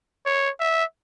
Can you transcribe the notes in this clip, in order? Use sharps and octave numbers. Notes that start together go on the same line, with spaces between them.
C#5
E5